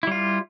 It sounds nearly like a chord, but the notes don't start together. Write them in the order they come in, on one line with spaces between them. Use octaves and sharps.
E4 G3 F4